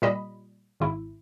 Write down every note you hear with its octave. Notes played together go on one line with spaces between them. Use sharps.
A#2 G3 D#5 B5
G#1 E4